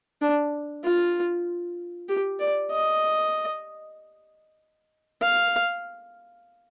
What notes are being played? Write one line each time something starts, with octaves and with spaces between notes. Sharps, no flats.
D4
F4
G4
D5
D#5
F5